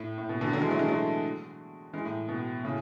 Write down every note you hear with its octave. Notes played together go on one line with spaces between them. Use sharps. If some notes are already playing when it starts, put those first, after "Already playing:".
Already playing: A2
A2
B2
B2 D3
D3 F#3
E3 G#3
F#3 A3
E3 G#3
F#3 A3
E3 G#3
A2
B2
A2 C#3